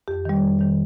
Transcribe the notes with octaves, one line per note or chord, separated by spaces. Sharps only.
F2 G4
D#3 G3
F2
D#3 G3